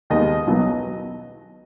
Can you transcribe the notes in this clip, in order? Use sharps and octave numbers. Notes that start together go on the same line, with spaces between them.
D#2 D#3 G#3 B3 D#4 D#5
B1 B2 F#3 B3